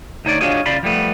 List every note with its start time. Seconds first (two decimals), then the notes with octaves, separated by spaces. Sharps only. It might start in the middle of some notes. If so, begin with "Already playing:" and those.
0.25 D2 D#4 C#5 D5
0.41 D4 F4 F#4 G#4 C#5 D#5
0.66 C#3 F4 D5 B5 C6
0.83 F3 G3 A3 B3